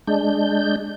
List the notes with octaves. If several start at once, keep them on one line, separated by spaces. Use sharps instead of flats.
G#3 D4 G6